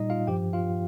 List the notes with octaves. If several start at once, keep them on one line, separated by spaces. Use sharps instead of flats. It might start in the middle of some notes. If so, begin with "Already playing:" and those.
Already playing: A#2 G3 D#4 D#5
F4 F5
G2 F3 G4 G5
F4 F5